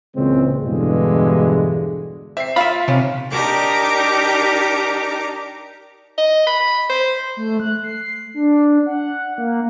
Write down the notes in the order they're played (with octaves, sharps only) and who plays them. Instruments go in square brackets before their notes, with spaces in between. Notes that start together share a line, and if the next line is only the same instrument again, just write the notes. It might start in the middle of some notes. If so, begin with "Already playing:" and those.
[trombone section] C#2 A#2 C#3 E3 G#3 C4
E2 G2 B2 D3 E3 G#3
[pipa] C4 [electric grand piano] E5 C7
[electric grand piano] F4 [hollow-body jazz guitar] E5 B5 [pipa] F5
[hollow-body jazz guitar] C3 [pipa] D#3 C#4
[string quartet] D4 D#4 G4 A#4 A#5 D6
[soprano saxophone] D#5
B5
C5
[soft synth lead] A3
F#6
C7
D4
F#5
A#3